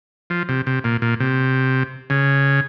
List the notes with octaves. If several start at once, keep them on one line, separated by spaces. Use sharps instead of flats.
F3
C3
C3
A#2
A#2
C3
C#3